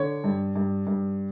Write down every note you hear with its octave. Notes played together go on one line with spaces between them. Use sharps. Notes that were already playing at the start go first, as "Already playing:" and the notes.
Already playing: D3 C#5
G2
G2
G2